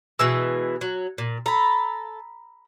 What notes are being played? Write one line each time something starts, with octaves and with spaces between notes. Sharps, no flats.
B2 E3 G#3 E6
F#3
A#2
A4 A#5 B5